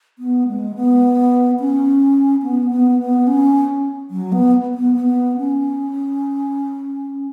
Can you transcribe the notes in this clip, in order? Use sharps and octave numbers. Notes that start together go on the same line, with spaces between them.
B3
G#3
B3
C#4
B3
B3
B3
C#4
F#3
B3
B3
B3
C#4